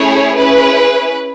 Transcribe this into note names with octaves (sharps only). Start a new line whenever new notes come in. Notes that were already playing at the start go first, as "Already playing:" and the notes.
Already playing: A3 C#4 E4 G#4 C#5
C#4 E4 G#4 B4